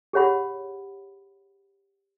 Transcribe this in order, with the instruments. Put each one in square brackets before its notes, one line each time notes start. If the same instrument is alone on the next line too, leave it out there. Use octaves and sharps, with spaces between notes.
[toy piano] G4 G#4 C#5 F#5 B5